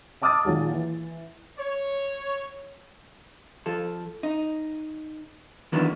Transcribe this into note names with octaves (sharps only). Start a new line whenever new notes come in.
D#5 A5 D6 D#6 F6 A6
A#2 D#3 F#3 G#3
E3
C#5
F3 A4
D#4
D#3 E3 F#3 A#3 B3 D4